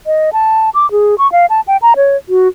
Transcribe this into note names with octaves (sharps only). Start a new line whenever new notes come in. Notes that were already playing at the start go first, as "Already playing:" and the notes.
D#5
A5
D6
G#4
C#6
F5
A5
G5
A#5
C#5
F#4